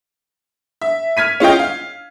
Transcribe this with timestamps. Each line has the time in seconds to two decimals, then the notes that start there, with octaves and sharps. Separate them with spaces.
0.81 E5
1.17 F6 G#6 B6 D#7
1.40 C#4 F4 D#5 G5
1.59 F5